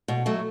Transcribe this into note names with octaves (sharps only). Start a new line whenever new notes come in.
B2
F#3 A3